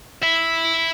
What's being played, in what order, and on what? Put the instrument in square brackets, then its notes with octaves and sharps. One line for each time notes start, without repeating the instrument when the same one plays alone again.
[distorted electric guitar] E4 E5